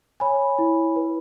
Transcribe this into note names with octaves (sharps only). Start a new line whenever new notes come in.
C#5 G#5 B5
E4
B4